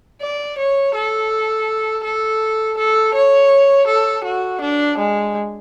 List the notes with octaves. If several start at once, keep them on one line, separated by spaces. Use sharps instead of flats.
D5
C#5
A4
A4
A4
C#5
A4
F#4
D4
G#3